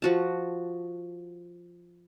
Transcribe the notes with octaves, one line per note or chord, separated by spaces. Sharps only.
F3 F#4 A5